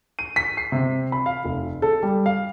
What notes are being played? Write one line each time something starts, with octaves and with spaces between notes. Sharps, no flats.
D#7
B6
C7
C3
B5
F5
F1
A4
G3
F5